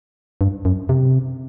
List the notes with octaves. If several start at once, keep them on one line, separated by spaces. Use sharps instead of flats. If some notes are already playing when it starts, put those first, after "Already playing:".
G2
F#2
C3